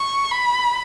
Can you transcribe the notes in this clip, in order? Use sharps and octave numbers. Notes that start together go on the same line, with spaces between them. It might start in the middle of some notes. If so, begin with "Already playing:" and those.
Already playing: C#6
B5